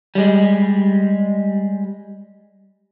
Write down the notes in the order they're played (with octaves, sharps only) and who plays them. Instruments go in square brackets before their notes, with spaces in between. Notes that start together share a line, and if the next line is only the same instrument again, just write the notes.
[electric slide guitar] G3 G#3